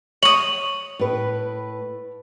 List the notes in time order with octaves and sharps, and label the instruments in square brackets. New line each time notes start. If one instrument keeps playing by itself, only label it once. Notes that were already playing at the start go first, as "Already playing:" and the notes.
[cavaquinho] C#5 D#6 [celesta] F#7
[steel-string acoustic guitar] A2 B4